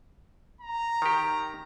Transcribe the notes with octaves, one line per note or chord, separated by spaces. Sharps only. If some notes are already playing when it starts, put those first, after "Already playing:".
A#5
D#3 G4